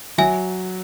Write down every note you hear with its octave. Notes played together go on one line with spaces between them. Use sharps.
F#3 E5 G#5